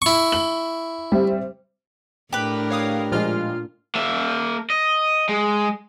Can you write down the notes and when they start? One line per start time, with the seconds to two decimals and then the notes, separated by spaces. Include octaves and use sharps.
0.02 E4 C#6
0.32 F#7
1.12 G3 C4 E5
2.33 A2 D4 G4 A#4 B4
2.70 C#5 F5 D#6
3.12 A#2 F3 G#3 F4 F6
3.95 A#3 E5
4.70 D#5
5.29 G#3